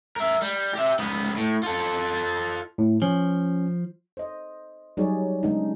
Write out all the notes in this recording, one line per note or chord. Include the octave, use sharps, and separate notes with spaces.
A#4 E5
G3
G4 E5
C#2 B3
A2
F4 A4
A2
F3 C#4
C5 D#5
F#3 G3 D#4 G#4 C#5 D5
C#3 G#3 B3 D4 D#4